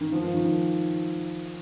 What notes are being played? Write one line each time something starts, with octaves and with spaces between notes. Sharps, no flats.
D#3
F3
F3
D#3